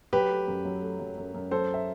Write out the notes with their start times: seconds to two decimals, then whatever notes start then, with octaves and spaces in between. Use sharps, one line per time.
0.13 F#3 G4 B4
0.30 A3
0.48 F#2
0.65 F#3
0.82 A3
0.99 F#3
1.17 F#2
1.34 F#2
1.51 F#3 A4 C5
1.74 E5